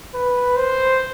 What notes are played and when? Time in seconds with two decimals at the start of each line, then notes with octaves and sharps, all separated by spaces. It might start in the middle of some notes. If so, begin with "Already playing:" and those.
0.14 B4
0.56 C5